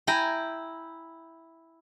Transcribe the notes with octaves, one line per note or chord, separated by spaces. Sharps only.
E4 G5 G#5 A#5